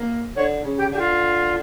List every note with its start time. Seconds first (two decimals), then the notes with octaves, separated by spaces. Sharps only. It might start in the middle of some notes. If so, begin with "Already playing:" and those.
Already playing: A#3
0.36 D3 C#5
0.64 C#3
0.78 G4
0.92 D3 G4
0.98 F4